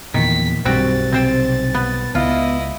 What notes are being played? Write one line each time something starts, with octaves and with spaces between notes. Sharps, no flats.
E2 A#2 D#3 F3 A#3 B6
B1 G2 G3 C4 F#4 G5 A6
C3 C4 C5 G5
B3
C#2 B3 E4 F4 D#5